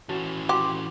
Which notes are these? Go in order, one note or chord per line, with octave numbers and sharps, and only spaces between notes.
E3 C#4 F#4 A5
F#4 G4 C6 D6